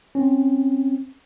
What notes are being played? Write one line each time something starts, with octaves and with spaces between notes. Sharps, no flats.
C4 C#4